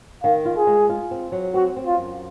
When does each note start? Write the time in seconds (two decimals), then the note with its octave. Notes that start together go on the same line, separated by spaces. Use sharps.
0.23 D#3 F5
0.45 F4
0.57 G#4
0.67 G#3
0.89 F4
1.11 C4
1.32 F#3
1.54 C4 F#4
1.76 C4
1.86 F4
1.98 F#2